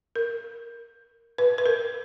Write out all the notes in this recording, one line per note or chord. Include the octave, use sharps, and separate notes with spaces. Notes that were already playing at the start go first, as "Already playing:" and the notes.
A#4
B4
B4
A#4